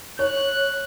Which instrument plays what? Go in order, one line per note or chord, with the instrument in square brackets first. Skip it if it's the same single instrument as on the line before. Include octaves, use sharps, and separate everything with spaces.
[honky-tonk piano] C#5 [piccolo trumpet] F#6